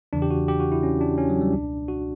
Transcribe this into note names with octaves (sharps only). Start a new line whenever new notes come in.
E2 C#3 E3 D4
G4
F#4
G4
F#4
E4
C#4
D4
C#4
F#3
G3
C#2 B2 D4
F#4